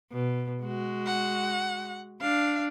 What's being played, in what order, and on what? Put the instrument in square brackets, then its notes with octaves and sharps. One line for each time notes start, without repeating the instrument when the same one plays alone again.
[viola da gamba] B2
G#3 F#4
[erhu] F#5
[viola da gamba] D4 [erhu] F5